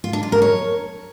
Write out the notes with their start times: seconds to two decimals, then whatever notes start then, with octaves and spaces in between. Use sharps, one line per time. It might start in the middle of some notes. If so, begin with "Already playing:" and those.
0.04 F4
0.13 D4
0.23 F4
0.32 A#4
0.42 C#5